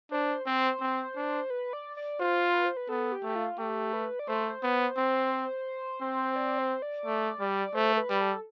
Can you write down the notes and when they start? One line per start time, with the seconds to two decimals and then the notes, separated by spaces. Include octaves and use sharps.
0.11 D4 C5
0.46 C4 C5
0.81 C4
1.16 D4
1.50 B4
1.73 D5
1.97 D5
2.20 F4 C5
2.54 B4
2.65 C5
2.77 B4
2.89 B3 A4
3.12 G4
3.23 A3
3.28 G4
3.35 F4
3.58 A3 G4
3.93 B4
4.19 D5
4.28 A3 C5
4.63 B3
4.97 C4
6.01 C4
6.36 D5
6.58 C5
6.82 D5
7.06 A3
7.40 G3
7.74 A3 C5
7.93 A4
7.97 B4
8.09 G3
8.21 A4